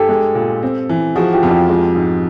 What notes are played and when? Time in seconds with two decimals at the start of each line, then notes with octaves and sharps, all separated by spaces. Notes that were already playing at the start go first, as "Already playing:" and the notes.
Already playing: G2 G4 A4
0.09 G#3
0.35 A#2
0.62 C4
0.89 E3
1.16 F3 F#4 G#4
1.33 F4 G4
1.43 F2
1.51 F4 G4
1.69 G#3 F4 G4
1.95 G#2